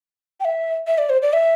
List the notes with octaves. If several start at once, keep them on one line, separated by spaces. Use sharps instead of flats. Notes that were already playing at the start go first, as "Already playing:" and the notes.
G5
E5
E5
D5
C5
D5
E5